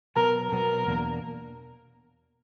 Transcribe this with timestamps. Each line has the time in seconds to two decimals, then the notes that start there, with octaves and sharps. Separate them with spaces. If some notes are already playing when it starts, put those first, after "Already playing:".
0.16 B2 F#3 B3 A#4
0.52 B2 F#3 B3 A#4
0.86 E2 B2 A#3 D4